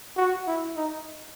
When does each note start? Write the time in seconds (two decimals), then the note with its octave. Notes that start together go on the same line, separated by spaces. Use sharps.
0.17 F#4
0.47 E4
0.77 D#4